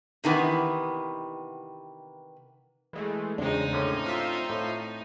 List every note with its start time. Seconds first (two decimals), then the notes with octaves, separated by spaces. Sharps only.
0.24 C3 D#3 E3 B3
2.93 E3 G#3 A3
3.38 E2 C#3 G#3 C4 D4 D#4
3.73 A2 D3 C#4
4.06 F4 C5 E5 F6
4.50 A2